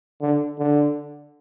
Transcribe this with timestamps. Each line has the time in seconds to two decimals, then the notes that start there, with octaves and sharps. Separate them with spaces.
0.21 D3
0.59 D3